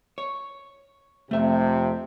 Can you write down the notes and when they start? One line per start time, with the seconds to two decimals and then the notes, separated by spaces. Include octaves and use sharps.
0.18 C#5
1.31 F2 C3 A3 E5